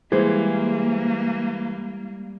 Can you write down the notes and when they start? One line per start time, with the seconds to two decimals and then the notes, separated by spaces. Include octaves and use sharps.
0.12 E3 G3 G#3 A#3 G#4 C5